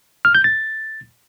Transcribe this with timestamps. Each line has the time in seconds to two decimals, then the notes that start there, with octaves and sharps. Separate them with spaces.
0.25 F6
0.35 G6
0.44 A6